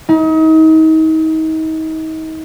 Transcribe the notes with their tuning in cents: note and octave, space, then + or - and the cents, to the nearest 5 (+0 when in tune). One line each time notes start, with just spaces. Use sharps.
D#4 +35